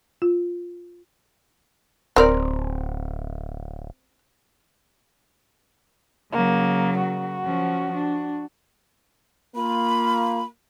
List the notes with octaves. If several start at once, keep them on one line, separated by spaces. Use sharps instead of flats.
F4
D1 C4 A#4 D5
C#3 F#3 A#3
F#4
F3 C#4
D4
A#3 F4 B5